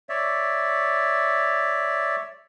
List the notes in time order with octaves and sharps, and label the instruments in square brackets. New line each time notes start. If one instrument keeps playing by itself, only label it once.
[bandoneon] C#5 D5 E5